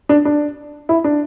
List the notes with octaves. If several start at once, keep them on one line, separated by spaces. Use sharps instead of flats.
D4
D4
E4
D4